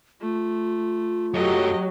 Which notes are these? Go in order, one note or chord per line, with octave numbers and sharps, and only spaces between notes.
A3 F4
F#2 F#3 A3 G4 D#5